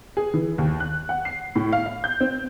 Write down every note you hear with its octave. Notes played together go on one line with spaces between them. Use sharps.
G#4
E3
D#2
F#6
F#5
C7
A2
F5
F5
G6
C4